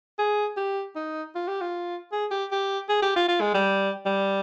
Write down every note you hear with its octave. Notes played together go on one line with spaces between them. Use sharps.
G#4
G4
D#4
F4
G4
F4
G#4
G4
G4
G#4
G4
F4
F4
G#3
G3
G3